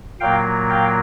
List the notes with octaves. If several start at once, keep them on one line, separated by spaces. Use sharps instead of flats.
A#2 F#3 A#3 F5 G5
F5 G5